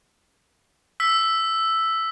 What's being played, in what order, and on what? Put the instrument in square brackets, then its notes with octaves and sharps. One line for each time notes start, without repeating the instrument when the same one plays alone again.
[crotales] E6 B6